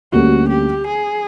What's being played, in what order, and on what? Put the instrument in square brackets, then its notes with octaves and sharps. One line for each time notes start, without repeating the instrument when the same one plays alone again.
[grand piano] D2 D3 G3 A#3 C#4 [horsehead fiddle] F#4
[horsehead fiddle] G4
G#4